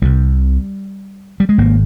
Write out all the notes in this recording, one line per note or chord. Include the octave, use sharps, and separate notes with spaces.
C2 C3 G3
G3
G#3
G#1 A#3